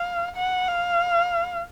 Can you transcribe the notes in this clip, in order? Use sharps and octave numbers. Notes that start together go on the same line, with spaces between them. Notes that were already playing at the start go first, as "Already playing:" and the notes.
Already playing: F5
F#5
F5